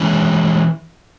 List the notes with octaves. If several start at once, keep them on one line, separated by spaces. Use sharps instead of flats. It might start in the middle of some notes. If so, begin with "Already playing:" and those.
Already playing: E3 G#3 C#4